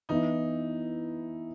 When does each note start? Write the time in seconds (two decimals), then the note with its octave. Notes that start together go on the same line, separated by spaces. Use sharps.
0.09 E3 B3 D#4 E4